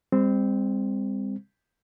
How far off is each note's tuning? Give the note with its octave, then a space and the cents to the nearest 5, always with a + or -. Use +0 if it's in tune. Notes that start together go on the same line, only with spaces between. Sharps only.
G3 +45 C4 -5